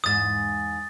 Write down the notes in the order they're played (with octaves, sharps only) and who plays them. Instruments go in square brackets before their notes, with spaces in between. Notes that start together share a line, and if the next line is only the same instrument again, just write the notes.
[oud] E2 G#2 [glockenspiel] D#6 A6